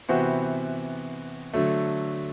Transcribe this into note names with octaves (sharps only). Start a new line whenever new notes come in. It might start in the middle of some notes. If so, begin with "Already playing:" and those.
C3 E3 B3 F#4 C5
D3 F#3 A3